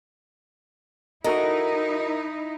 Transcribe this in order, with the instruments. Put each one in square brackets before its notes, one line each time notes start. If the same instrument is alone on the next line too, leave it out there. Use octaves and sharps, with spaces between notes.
[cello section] D#4 E4 [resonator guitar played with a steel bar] F#4 A4 D#5 [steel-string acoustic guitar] A#4